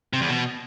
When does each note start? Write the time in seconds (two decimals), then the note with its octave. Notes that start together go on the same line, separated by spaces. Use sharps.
0.13 C3
0.21 E2
0.29 B2